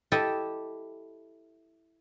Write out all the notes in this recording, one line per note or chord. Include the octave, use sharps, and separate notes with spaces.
E4 G4 A4 D#5